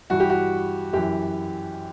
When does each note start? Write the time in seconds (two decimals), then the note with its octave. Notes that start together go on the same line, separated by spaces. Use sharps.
0.10 G2 E3 F#4
0.20 G4
0.30 F#4
0.93 F#2 E3 G4